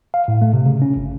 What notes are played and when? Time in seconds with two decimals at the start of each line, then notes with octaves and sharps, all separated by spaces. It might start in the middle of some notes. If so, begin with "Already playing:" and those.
0.14 F5
0.28 A2
0.42 A3
0.53 C3
0.66 C#3
0.82 C#4
0.96 G1